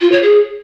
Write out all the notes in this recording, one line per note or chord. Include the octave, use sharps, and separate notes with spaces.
F4
C#5
G#4